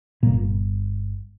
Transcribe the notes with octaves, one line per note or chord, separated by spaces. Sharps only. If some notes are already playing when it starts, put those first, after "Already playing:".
G1 A#2 A#3